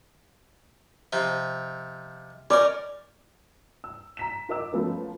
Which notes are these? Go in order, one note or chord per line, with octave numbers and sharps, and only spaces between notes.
C3 F3 D#4
C#4 D#4 A#4 D5
E6
A#5 B6 E7
F4 A#4 D#5 D6 E6
F3 A3 B3 C#4 A#4